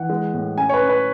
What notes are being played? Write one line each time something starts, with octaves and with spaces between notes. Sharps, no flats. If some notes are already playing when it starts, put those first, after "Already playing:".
Already playing: E3 F#5
G#3
A2
C#4 G#5
C#5
B4
C#4
B4